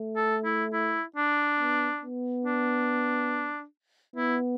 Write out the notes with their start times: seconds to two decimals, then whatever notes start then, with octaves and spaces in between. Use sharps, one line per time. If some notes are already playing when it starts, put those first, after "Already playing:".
Already playing: A3
0.16 A4
0.45 E4
0.73 E4
1.16 D4
1.59 B3
2.02 B3
2.45 D4
4.16 B3 E4